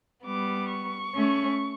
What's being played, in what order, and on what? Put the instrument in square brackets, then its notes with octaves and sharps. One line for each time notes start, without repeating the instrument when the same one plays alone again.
[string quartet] G3 B3 [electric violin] D6
[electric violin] C#6
[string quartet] A3 C#4